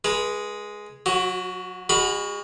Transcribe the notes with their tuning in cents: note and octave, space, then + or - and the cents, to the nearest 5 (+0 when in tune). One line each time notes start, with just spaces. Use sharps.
G#3 +0 B4 -30
F#3 -30 F#4 +15
G#3 -35 F#4 +10 B5 +0